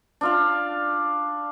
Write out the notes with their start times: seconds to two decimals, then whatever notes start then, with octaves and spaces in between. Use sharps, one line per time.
0.21 D4 F4 F5